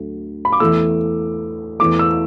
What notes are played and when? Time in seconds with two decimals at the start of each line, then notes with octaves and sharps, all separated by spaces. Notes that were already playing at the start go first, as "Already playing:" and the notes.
Already playing: D2 D3 F#3 A3
0.45 B5
0.53 D6
0.60 E2 E3 A3 E6
1.79 E2 E3 A3 D6
1.99 E6